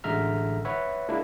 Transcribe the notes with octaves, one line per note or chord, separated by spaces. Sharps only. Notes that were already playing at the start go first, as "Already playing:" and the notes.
A1 D3 G#3 E5 A#5 F6
B4 C#5 E5 F#5
G#3 A#3 D4 E4